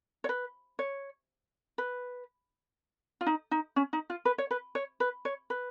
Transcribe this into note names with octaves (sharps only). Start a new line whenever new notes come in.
C#5
B4
C#5
B4
F4
D#4
D#4
C#4
D#4
F4
B4
C#5
B4
C#5
B4
C#5
B4